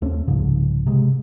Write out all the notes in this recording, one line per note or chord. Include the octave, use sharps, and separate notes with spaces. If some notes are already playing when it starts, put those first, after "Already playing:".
D#2 A3 C4 C#4
C2 G#2 C#3 F3
C3 G#3